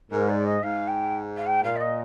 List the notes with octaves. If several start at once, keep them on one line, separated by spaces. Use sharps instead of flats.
G#2 A#4
D5
D#5
G#2 F5
G5
F5
G5
A#2 F5
D5
D#5